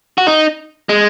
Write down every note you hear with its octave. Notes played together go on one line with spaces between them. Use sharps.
F#4
D#4
G#3